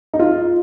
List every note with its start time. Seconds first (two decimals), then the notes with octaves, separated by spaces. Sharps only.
0.14 D#4
0.19 F4